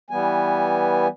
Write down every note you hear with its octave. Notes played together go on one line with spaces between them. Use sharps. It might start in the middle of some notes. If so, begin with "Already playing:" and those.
E3 G3 B3 G#5